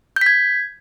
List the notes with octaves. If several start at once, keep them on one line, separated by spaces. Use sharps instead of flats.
G6 G#6 B6